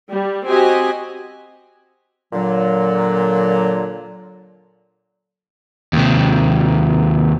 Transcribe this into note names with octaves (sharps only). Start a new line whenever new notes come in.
G3
C4 F#4 G4 D#5 G#5
A#2 D3 F#3
D#2 C3